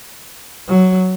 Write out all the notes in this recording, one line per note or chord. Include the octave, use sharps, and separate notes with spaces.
F#3